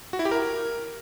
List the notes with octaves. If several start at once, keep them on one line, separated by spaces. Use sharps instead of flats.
F#4
E4
G4
A#4